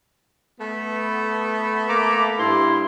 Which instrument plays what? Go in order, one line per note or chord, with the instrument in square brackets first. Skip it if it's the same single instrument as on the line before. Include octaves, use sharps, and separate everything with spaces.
[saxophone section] A3 B3
[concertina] A#3 A#5 D6
[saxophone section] G2 [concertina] E4 C6